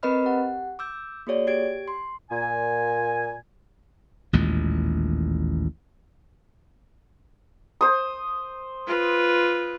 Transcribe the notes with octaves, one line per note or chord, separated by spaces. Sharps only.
C4 A#4 B4 D#5 B5 F6
G4 F#5
D6 E6 G6
A#3 F#4 G#4 C#5 D5
G4 G#6 D7
C6
A#2 G#5
A1 D#2 A#2 G#3
C5 D#6
F4 B4